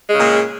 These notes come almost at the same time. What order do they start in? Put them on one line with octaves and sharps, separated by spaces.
G#3 C#3 A#2